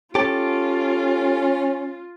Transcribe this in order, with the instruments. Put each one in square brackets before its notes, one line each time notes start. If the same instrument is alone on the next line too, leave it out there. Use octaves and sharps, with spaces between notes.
[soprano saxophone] C#4 [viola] F4 [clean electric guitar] G4 A4